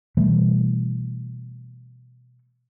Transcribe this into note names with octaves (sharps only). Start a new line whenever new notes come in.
B2 E3 G3 A3